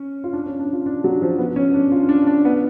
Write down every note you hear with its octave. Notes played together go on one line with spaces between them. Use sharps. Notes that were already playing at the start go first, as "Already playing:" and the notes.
Already playing: C#4
F4
D4
C#4
D4
F4
D4
F#3
F3
B3
C#4
D4
F4
D4
D4
B3